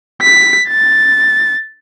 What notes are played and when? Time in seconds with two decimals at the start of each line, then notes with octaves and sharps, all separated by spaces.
0.22 B6
0.68 A6